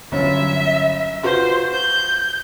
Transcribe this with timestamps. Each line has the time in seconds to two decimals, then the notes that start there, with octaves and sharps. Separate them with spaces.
0.12 G1 F#3 C#4 E5
1.23 F4 F#4 B4 C5
1.73 G6